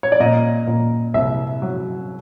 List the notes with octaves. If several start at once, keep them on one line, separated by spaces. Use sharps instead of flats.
C#5
D5
A#2 D#5
A#2
C2 E5
F#3